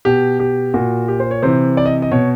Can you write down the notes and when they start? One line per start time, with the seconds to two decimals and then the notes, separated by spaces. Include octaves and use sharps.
0.05 B2 G4
0.40 G4
0.74 A#2 F#4
1.08 G4
1.20 C5
1.31 C#5
1.42 C3 E3 C5
1.77 D5
1.86 D#5
2.02 D#5
2.11 B2 C#5